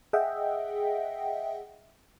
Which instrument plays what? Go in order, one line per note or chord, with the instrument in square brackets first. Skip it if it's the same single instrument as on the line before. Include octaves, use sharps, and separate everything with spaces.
[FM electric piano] G#4 D#5 E5 F#5 G5